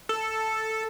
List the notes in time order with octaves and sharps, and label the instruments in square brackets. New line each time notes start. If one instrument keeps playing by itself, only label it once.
[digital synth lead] A4